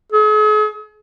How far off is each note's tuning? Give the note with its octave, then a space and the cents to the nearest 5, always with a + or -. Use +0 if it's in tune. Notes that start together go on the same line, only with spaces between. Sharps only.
G#4 +45